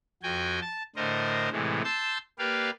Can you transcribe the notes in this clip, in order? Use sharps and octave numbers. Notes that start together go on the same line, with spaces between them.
F2 F#4 G5 G#5
A5
A2 D3 A#4 C5 D#5
A2 C3 E3 G#3
A5 C6 E6 G6
A#3 G4 B4 D5 F5